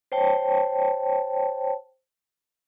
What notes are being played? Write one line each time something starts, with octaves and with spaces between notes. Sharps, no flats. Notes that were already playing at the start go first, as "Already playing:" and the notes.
C5 C#5 G5 A5